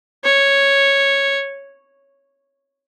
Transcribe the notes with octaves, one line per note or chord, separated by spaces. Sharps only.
C#5